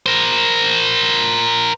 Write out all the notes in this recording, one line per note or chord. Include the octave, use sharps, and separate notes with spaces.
A#4 C5